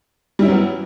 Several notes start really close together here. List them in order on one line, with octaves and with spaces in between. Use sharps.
G3 E4 C#4 F#3 B3